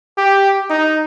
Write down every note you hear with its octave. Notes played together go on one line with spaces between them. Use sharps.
G4
D#4